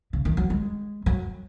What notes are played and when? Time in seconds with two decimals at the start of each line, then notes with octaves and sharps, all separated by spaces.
0.13 C#3
0.25 D#3
0.37 F#3
0.50 G#3
1.06 F#3